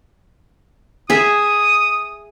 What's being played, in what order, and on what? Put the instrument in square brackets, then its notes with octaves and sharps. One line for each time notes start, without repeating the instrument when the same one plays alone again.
[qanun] G#4 E5 [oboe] D#6